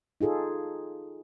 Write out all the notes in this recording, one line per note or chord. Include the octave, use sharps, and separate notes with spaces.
D#4 F4 G#4 A4